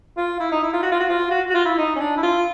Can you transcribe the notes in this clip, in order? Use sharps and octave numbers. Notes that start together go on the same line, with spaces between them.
F4
E4
D#4
E4
F4
F#4
F4
F#4
F4
F#4
F#4
F4
E4
D#4
C#4
D4
E4
F4